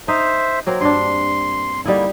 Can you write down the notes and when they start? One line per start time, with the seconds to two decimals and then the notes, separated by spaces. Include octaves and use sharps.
0.08 D#4 C5 E5
0.66 F#3 A#3 C4
0.81 G2 D4 C6
1.86 D3 G3 A#3 D#4 E4